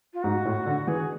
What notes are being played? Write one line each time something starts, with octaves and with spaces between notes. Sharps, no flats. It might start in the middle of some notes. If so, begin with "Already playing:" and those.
F4
G#2 F#4
A2
D3
E3 G#4